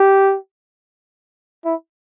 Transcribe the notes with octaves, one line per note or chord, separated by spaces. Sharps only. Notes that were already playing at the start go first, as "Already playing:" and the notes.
Already playing: G4
E4